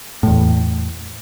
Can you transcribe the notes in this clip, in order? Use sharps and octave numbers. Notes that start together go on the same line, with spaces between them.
E2 A2